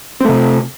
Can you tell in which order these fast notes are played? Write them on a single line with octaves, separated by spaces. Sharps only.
C4 A3 C3